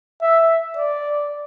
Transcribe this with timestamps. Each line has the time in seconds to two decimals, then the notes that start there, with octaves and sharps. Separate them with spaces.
0.22 E5
0.77 D5